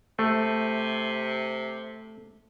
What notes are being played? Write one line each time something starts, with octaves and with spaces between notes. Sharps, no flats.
C3 A3